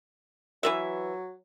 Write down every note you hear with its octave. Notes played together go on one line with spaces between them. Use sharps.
E3 F#3 B4 E5